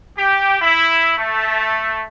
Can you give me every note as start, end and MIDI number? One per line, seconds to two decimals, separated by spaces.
0.16 0.57 67
0.62 1.13 64
1.18 2.01 57